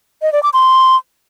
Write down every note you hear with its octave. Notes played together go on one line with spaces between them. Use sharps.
D#5
D5
D6
C6